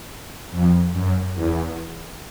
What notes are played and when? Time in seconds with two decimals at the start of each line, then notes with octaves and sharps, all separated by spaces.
0.51 F2
0.93 F#2
1.34 E2